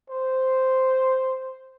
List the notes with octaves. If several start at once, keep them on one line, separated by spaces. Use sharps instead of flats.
C5